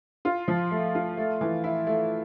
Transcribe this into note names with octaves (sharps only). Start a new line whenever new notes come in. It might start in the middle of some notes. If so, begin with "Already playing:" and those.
F4
F3
A3
F4
A3
E3
E4
A3